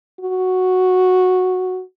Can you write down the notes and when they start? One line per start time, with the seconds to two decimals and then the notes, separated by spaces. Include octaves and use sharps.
0.20 F#4